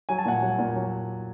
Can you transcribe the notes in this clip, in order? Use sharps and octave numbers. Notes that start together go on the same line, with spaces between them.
F#3 G#5
A5
A#2 F#5 G#5
F#3
A#2
F#3